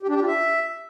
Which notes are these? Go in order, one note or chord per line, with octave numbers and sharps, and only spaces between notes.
G4
D4
G4
F4
E5